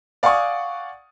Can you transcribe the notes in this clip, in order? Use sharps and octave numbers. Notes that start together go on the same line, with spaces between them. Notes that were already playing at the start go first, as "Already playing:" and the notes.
D5 F5 F#5 G#5 C#6 D#6